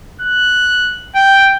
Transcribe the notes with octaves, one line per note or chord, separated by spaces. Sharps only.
F#6
G5